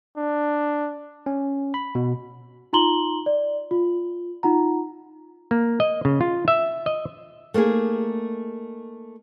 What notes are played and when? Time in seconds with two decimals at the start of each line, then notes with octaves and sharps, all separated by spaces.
0.17 D4
1.26 C#4
1.74 B5
1.95 B2
2.73 D#4 F4 A#5 C6 F#7 G7
3.26 D5
3.71 F4
4.43 D#4 F4 F#5 A#5
5.51 A#3
5.80 D#5
6.05 C#3
6.21 F4
6.48 E5
6.86 D#5
7.54 A3 A#3 D#4 G#4